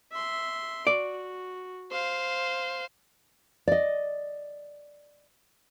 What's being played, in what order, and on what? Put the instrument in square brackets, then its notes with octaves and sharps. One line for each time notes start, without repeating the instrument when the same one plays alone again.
[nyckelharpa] E5 C6
[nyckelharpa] F#4 [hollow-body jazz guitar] D5
[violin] C5 [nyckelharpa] F5
[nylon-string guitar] D5 D#5